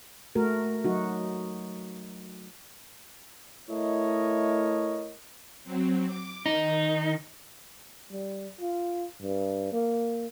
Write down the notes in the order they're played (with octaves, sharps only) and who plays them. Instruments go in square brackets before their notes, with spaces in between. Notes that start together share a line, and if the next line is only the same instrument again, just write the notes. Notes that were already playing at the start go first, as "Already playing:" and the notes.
[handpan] A3 F#4 A#4
F#3 D#4 F#4
[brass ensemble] A3 E4 A#4 C#5 D#5
[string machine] F#3 C4
D6
[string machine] D#3 [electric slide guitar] D#4
[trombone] G3
F4
G2
A#3